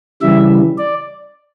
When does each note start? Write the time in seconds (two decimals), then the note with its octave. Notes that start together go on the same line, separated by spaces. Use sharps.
0.22 C#3 E3 G3 E5
0.78 D5